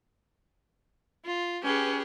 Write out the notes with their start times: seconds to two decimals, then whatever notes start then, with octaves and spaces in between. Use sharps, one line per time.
1.25 F4
1.64 C#4 G4 G#4 B4